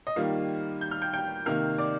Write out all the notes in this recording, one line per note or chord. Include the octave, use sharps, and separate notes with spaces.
D#5
D#3 G3 A#3 F4 F5
G6
F6
G5 G6
G5 G6
C3 D#3 A#3 F5 F6
D5 D6